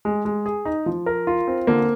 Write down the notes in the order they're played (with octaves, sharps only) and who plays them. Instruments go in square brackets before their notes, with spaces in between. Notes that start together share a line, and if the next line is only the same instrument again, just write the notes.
[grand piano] G#3
G#3
G#4
D#4
F3
A#4
F4
C4
[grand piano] D3 [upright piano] A#3